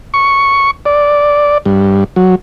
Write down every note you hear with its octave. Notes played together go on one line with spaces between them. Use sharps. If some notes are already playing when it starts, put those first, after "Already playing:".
C#6
D5
G2
F#3